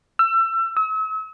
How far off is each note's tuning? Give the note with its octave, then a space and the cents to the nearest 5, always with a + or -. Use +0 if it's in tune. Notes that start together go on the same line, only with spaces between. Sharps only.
E6 +30
E6 -40